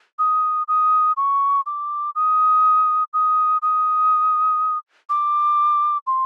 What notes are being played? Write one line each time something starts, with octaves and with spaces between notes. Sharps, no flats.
D#6
D#6
C#6
D6
D#6
D#6
D#6
D6
C6